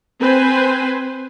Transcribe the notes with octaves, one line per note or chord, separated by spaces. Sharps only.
C4 B4 C5 G#5